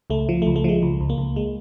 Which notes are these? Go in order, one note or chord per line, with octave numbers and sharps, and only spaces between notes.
C#2 A3
F3
A3
C#2
A3
F3 G#3
C#2
C#2
A#3
C#2
G#3